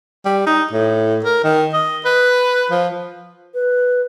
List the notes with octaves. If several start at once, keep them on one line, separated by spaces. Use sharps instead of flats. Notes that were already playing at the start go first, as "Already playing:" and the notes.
G3
D#4
A2
A#4
D#3
D#5
B4
F3
B4